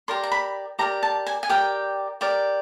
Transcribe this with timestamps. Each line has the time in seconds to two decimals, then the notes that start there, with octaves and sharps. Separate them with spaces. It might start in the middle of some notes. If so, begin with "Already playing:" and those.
0.08 G4 A#4 D5 C6
0.23 A#5
0.32 B5
0.79 G4 A#4 D5 A#5
1.03 A5
1.27 G#5
1.43 G#5
1.49 G4 A#4 D5 G5
2.21 G4 A#4 D5